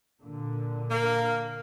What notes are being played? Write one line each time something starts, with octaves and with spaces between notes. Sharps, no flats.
A#2 D3
A#3